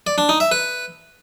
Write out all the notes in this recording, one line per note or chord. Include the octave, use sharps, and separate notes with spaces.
D5
D4
D#4
E5
B4